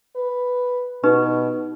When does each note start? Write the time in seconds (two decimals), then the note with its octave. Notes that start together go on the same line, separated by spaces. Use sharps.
0.16 B4
1.03 B2 D#4 G4 B4